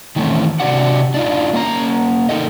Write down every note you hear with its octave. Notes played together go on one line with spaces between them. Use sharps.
D#3 E3 A3 C4 C#4
C3 B3 D4 F#4 G4 F#5
D4 D#4 F4
A#3 C#4 B4 A#5
D#4 A4 A#4 D#5